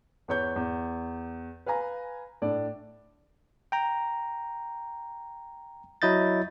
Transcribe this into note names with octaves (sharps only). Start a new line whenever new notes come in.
E2 B4 C#5 C#6 G6
E2
B4 F5 G#5 A#5
A2 D4 D5
G5 A#5
F#3 E4 D#5 G6 A6